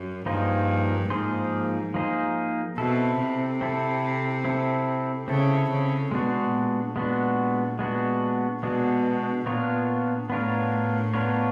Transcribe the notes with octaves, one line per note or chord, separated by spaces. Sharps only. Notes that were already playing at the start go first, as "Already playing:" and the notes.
Already playing: F#2
G2 F3 A#3 D#4 G#4 C5
G#2 F3 A#3 D#4 G#4 C5
F3 A#3 D#4 G#4 C5
B2 C4 E4 A4
C3
C4 E4 A4
C4 E4 A4
C#3 C4 E4 A4
C#3
B2 G#3 B3 D4 F#4
A#2
G#3 B3 D4 F#4
G#3 B3 D4 F#4
B2 G#3 B3 D4 F#4
A#2 B3 D4 F4 A#4 C#5
A2 B3 D4 F4 A#4 C#5
B3 D4 F4 A#4 C#5